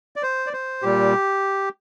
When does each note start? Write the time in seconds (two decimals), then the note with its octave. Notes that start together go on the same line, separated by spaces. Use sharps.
0.16 D5
0.23 C5
0.46 D5
0.53 C5
0.82 A#2 G3 G4